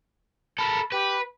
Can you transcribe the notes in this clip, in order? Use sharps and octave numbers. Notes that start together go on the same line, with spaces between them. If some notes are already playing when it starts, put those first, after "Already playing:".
A4 A#4 B5
G4 B4